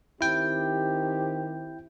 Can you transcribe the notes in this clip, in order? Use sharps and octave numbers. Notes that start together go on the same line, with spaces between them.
D#3 C4 E4 G4 G5